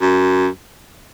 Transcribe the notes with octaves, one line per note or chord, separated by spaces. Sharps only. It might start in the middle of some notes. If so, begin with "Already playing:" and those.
F#2